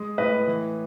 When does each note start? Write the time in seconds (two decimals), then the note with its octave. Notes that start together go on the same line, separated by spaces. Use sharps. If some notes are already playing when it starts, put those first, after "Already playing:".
Already playing: G#3
0.18 A2 B4 D#5
0.47 E3